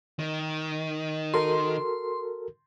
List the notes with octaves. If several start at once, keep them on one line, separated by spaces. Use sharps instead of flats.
D#3
F#4 A4 A#4 C6